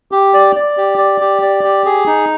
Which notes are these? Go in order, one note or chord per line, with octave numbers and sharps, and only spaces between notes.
G4
D5
D5
G4
D5
G4
D5
G4
G#4
D#4